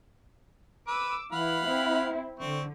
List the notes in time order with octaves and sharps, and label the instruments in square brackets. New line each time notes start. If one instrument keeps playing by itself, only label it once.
[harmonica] B4 [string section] D6 E6
[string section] E3 E4 [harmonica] F5 F#5 B5
[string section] C4 E4
[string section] D3 [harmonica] C4 C#6